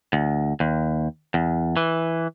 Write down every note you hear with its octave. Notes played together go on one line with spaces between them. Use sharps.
D2
D#2
E2
E3